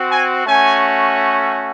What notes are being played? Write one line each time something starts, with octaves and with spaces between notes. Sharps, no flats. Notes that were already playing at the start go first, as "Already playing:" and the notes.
Already playing: C4 F#4
G#5
A3 C#4 F#4 G#5